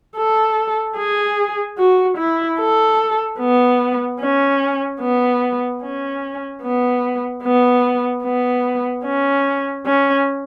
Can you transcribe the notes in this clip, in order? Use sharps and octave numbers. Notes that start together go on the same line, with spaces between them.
A4
G#4
F#4
E4
A4
B3
C#4
B3
C#4
B3
B3
B3
C#4
C#4